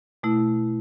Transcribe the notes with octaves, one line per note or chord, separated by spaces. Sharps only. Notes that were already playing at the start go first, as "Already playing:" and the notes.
B2 A3 E4